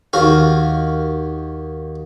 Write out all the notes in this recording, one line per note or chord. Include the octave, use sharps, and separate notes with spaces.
D#2 F#4 F5